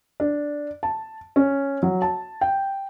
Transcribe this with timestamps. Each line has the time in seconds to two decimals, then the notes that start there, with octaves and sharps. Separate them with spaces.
0.20 D4
0.83 A5
1.36 C#4
1.83 F#3
2.02 A5
2.41 G5